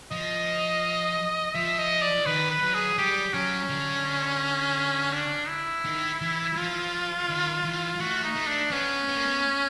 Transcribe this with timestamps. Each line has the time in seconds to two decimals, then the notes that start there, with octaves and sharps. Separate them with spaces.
0.11 F3 D#5
1.54 F3 E5
1.79 D#5
2.02 D5
2.26 D#3 B4
2.51 B4
2.62 F#3
2.75 G#4
2.98 G3 G4
3.34 F#3 C#4
3.70 D3
5.13 D4
5.49 E4
5.85 D#3
6.21 E3
6.56 F3 F4
7.29 D#3
7.64 E3
8.00 A3 F#4
8.24 D#4
8.36 A3
8.47 D4
8.72 B3 C#4
9.08 B3
9.16 A#3
9.25 B3